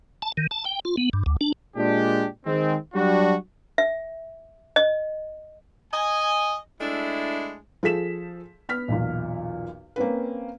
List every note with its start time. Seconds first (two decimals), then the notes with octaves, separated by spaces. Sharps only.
0.22 A5
0.37 D#3
0.51 A5
0.65 G5
0.85 F4
0.97 B3
1.13 G2
1.26 D2
1.41 D4
1.77 A#2 G#3 D4 G4
2.46 D#3 G#3 C4
2.94 F#3 G3 D4 F#4
3.78 E5
4.76 D#5
5.93 D#5 G#5
6.81 G#3 A3 D4 E4
7.83 F3 G#4 A4 B6 E7
8.69 B3 F6 B6
8.88 B1 E2 A#2
9.96 A#3 C4 C#4 B4